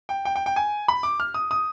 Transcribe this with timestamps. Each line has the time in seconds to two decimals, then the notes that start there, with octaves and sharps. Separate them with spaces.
0.09 G5
0.25 G5
0.36 G5
0.46 G5
0.56 G#5
0.88 B5
1.03 D6
1.20 F6
1.34 D#6
1.51 D#6